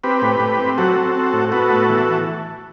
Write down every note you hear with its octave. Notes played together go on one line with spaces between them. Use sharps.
C4 G4 B4
A2
A2
C4
F#3 F#4 A4
C4
C4
A2
B3 F#4 A4
A2
E3